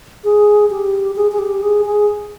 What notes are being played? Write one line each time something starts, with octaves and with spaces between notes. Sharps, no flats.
G#4
G4
G#4
G#4
G4
G#4
G#4